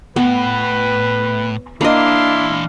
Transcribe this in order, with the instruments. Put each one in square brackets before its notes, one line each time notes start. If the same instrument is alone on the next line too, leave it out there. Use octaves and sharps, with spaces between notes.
[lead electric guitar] A2 [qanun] B3 [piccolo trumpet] B4
[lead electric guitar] E3 C6 [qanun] A#3 D#5 [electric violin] D4 F5 [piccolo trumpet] E4